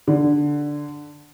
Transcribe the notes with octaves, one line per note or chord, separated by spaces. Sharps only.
D3